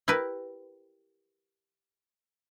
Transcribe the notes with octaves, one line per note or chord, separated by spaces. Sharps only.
E4 G4 A#4 B4